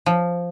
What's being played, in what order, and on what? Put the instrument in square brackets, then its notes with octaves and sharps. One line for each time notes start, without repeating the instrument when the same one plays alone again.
[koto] F3